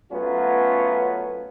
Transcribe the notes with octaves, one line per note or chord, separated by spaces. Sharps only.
F#3 A3 B3 C#4 F4